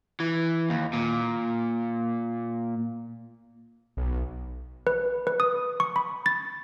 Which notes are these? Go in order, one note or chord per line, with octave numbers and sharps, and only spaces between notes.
E3
D#2
A#2
B1
B4
B4
D#6
C#6
B5
A6